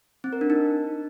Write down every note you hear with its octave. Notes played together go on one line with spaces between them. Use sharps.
C4
A#4
D4
D#4